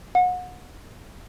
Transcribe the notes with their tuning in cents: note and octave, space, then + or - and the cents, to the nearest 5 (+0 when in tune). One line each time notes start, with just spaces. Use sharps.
F#5 -30